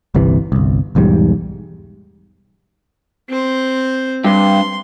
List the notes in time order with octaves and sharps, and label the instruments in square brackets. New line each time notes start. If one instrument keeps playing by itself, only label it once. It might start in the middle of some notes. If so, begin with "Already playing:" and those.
[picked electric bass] G1 C2 C3 E3
G1 C2
B1 E2 G#2 G3
[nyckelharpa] C4 C5
[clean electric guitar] G2 [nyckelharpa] C6